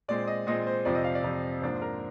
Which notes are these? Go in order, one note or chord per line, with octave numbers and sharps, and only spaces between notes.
A#2 G#3 C4 D5
D#5
A#2 G#3 C4 D#5
C5
F2 C3 F3 C4 D5
D#5
F5
D5
F2 C3 F3 C4
G#2 F3 A#3 D4 C5
A#4